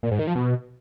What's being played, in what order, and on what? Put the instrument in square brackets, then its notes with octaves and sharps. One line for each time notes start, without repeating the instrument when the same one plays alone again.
[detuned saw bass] A#2
G#2
D#3
F3
B2